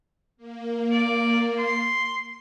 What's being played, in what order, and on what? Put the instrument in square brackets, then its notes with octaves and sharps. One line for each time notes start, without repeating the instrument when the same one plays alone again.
[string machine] A#3
[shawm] D5
C6